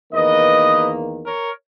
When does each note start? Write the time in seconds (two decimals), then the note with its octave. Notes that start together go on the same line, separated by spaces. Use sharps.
0.13 E2 D#3 A#3 B4 D#5
1.25 A#4 C#5